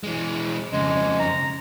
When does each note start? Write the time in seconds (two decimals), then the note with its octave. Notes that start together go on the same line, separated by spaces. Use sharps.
0.04 E3 G#3
0.73 F2 C#3 G#3
1.19 A#5